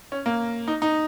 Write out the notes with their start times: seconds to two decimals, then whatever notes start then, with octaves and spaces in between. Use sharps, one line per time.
0.12 C#4
0.26 A#3
0.68 D#4
0.82 D#4